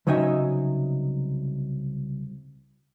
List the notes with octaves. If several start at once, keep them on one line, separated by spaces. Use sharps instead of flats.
C2 C#3 F#3 D#4 E5 G#5